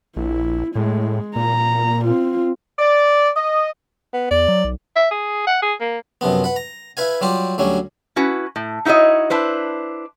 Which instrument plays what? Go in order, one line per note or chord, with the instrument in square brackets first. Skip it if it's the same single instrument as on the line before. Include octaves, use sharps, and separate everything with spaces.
[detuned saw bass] A#1 [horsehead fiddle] E4
[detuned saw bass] A2 [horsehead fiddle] G#3
[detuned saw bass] A#2 [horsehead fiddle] A#5
[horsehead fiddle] C4 F4
[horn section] D5
D#5
[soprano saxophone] B3
[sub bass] E2 [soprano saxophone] D5
[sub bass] F#3
B1
[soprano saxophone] E5
G#4
F#5
G#4
A#3
[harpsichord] F#2 C3 F3 B3
B4 F#5
A#5
E4 B4 F5 G#5
F#3 G3 F4 G4
D2 F#3 G3 C#4
[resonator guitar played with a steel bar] C#4 E4 F#4 B4
A2
D#4 E4 F#4 C#5 D#5
D4 E4 B4 C5